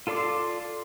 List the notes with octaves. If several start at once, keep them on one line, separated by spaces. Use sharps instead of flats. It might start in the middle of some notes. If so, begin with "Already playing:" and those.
F4 A4 D5 C6 D6